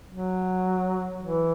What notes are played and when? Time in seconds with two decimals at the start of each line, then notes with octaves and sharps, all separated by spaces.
0.11 F#3
1.22 E3